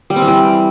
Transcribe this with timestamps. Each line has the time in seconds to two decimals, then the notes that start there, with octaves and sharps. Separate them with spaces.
0.10 G3
0.16 C4
0.22 E3
0.28 G3